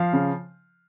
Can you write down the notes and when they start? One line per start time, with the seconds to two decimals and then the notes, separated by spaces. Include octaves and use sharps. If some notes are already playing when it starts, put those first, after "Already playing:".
Already playing: F3 F5
0.13 C#3